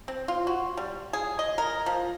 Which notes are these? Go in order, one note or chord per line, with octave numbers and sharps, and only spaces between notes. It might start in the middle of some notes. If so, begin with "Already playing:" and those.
C4
F4
F#4
G3
G#4
D#5
A#4
F3